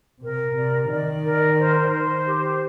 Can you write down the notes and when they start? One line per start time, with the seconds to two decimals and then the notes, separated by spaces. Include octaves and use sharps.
0.23 C3 A#4
0.56 C3 D5
0.91 D#3 D5
1.24 A#4
1.58 C5
1.92 C5
2.26 G4